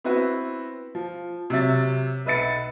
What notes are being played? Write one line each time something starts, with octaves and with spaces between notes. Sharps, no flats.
B3 C4 E4 F#4 B4
F3
C3 F#3 E5 A6
B1 B4 E5 A6 C#7